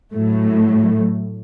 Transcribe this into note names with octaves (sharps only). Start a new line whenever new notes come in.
A2 F#3 A3